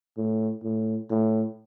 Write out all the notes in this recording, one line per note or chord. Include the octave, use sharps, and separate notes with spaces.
A2
A2
A2